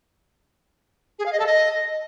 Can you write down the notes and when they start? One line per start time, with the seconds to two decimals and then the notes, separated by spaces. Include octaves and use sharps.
1.18 G#4
1.25 F5
1.32 D#5
1.39 A4
1.46 D#5